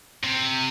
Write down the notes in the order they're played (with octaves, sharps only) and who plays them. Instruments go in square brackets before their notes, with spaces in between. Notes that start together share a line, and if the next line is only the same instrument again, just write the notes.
[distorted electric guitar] C3